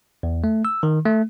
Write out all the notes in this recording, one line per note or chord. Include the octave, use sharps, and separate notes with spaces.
E2
A3
E6
D#3
A3